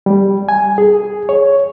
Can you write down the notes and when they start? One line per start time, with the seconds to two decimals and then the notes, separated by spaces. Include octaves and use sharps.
0.06 G3
0.49 G#5
0.78 G#4
1.29 C#5